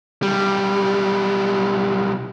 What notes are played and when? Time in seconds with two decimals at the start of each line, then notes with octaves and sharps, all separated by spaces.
0.22 B1 G3